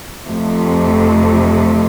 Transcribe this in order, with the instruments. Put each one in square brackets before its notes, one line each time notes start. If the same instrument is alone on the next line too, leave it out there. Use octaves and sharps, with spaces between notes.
[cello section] F2 C3 F3 A3